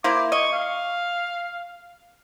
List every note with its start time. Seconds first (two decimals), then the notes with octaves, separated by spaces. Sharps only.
0.04 A#3 E4 C5 D6
0.32 D#5 C#6
0.53 F5